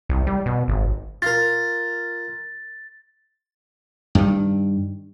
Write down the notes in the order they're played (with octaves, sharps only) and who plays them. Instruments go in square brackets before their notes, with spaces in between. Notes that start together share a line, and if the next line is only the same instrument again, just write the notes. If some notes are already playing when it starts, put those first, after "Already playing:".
[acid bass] C2
G3
B2
G#1
[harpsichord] F4 A#4 [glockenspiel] A6
[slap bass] G2 D#3